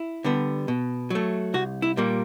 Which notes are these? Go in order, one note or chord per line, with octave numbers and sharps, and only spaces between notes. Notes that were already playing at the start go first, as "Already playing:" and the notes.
Already playing: E4
D3 G3 B3
B2
F#3 A3
C2 F#4
E4
A#2 G3 A#3